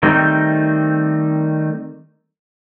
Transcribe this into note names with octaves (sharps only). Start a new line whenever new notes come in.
D#3 G3 A3 C4 D#4